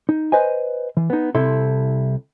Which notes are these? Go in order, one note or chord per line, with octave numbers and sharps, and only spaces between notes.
D#4
B4 C5 D#5 G#5
E3
B3 D#4
C2 C3 E4 A4 C6